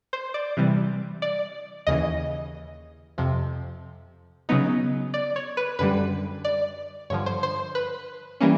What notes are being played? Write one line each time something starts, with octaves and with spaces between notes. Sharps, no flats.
C5
D5
C3 E3 G3
D5
D#2 C#3 E3 D#5
F2 C3 F3
C#3 F#3 B3 D#4
D5
C#5
B4
F#2 D3 G3 B4
D5
G2 D3 F3 C#5
C5
C5
B4
E3 G3 A#3 C#4